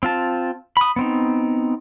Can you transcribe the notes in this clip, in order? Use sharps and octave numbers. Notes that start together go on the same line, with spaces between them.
C4 F4 A5
B5 D#6
B3 C4 D#4